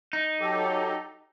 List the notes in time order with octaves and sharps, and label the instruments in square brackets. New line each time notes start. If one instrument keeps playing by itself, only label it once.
[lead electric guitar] D#4
[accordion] F#3 G4 A4